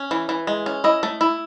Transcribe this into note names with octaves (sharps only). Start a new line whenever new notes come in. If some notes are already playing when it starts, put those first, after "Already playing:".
Already playing: C#4
E3
E3
G#3
C#4
E4 D#5
A3
E4